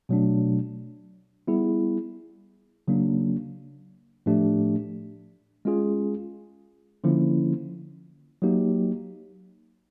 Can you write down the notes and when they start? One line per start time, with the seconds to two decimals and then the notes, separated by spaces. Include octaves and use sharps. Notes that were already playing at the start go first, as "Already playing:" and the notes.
0.09 B2 F#3 A3 D4
1.48 G3 B3 E4 G#4
2.88 C#3 F#3 A#3 D4
4.26 A2 F3 A3 D4 G4
5.65 G#3 C#4 F4 G#4
7.04 D3 F3 A#3 C#4 E4
8.42 F#3 A#3 D#4 G4